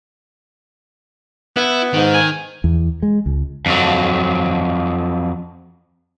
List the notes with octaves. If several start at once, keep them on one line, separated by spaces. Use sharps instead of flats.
B3 E4
G#2 D#3
G#5
E2
G#3
C#2
F2 F#3